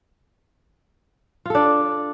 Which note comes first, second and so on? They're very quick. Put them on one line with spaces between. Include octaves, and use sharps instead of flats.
F4 A4 D4